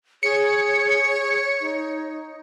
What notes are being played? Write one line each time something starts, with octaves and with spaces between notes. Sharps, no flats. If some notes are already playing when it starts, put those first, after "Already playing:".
G#4 C#5 C#7
D#4